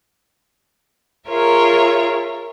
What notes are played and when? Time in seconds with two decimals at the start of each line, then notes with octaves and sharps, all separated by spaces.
1.28 F4 G#4 A#4 C#5 E5